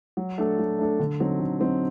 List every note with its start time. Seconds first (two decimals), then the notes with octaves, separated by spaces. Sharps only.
0.17 F#3
0.38 A3 D4 A4
0.59 F#3
0.79 A3 D4 A4
1.00 D3
1.20 F#3 C4 D#4
1.40 D3
1.60 F#3 C4 D#4